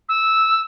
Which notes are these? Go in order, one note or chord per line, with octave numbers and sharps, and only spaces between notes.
E6